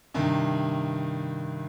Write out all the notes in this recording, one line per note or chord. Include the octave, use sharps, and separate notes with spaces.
G2 C3 D#3